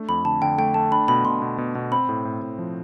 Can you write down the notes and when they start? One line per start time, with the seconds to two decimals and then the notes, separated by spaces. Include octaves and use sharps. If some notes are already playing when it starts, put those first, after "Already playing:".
Already playing: A3 D4
0.09 F2 B5
0.25 D3 A5
0.42 D3 G5
0.58 A3 G5
0.74 A3 A5
0.91 D4 B5
1.08 B2 B5
1.25 B2 C6
1.42 B2
1.58 B2
1.75 B2
1.92 C4 B5
2.09 A2
2.25 A2
2.42 A2
2.59 F3